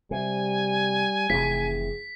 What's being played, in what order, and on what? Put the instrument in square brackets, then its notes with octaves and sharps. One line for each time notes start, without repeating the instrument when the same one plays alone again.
[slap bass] C3 [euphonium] G3 [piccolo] G#5
[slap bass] F1 C3 E3 [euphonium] G#4 [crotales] B6